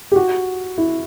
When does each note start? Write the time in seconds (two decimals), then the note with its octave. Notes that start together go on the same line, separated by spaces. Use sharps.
0.12 G4
0.16 F#4
0.78 E4